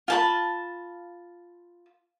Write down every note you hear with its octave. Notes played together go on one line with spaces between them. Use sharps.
F4 A5 B5